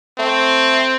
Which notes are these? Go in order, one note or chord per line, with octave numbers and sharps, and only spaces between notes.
A3 C4